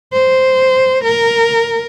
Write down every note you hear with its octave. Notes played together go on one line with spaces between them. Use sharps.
C5
A#4